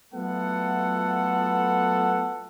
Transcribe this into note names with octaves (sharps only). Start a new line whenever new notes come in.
F#3 A3 B3 F4 A4 F#5